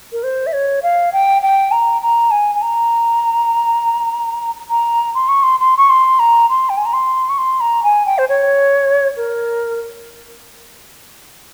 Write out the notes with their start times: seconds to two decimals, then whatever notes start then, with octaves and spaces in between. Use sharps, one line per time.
0.13 A#4
0.23 C5
0.47 E5
0.53 C#5
0.83 F5
1.13 G5
1.42 G5
1.72 A#5
2.02 A#5
2.31 G#5
2.55 G#5
2.62 A#5
4.70 A#5
5.15 C6
5.28 C#6
5.43 C6
5.60 C6
5.77 C#6
5.90 C6
6.19 A#5
6.50 C6
6.69 G5
6.77 G#5
6.86 A#5
6.93 C6
7.29 C#6
7.38 C6
7.61 A#5
7.83 G#5
8.06 G5
8.18 C5
8.29 C#5
9.17 A#4